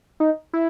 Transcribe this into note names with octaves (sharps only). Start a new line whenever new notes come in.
D#4
E4